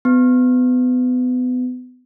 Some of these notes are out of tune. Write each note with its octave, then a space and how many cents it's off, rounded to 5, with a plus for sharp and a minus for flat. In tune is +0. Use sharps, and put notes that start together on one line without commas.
B3 +30